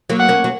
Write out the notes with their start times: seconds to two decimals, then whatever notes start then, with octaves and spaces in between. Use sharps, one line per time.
0.09 F#3 A#3
0.20 F#5
0.29 A#3 C#4
0.44 F#3